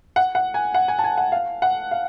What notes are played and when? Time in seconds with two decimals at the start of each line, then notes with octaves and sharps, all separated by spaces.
0.16 F#5
0.35 F#5
0.54 G#5
0.74 F#5
0.88 G#5
0.99 A5
1.04 G#5
1.18 F#5
1.32 F5
1.62 F#5
1.91 F5